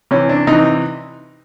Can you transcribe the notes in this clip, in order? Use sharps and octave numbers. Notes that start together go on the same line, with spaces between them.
C3 E3 C#4
D4
C3 E3 D#4